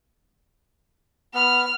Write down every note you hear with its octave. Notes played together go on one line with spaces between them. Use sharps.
B3 F6